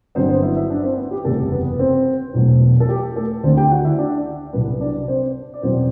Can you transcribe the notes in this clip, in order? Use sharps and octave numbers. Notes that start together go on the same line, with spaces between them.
G1 G2 F#3 B3 C4 C5
C4 C5
E4 E5
E4 E5
D4 D5
C4 C5
B3 B4
G4
F#1 E2 C3 G3 A3 B3 A4
B3 B4
C4 C5
E1 E2 B2 F#3 A3
A4
G4
A3 A4
D2 D3 A3 C4 C5
G4 G5
F#4 F#5
E4 E5
D4 D5
C2 C3 F#3 B3 B4
D4 D5
C4 C5
D5
E2 B2 F#3 B3 C4 C5